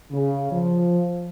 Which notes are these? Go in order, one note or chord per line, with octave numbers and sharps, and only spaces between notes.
C#3
F3